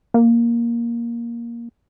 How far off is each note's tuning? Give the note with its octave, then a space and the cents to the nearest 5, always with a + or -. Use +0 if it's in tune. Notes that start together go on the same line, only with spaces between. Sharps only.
A#3 +10